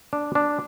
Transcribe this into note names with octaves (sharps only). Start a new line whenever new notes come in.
D4
D4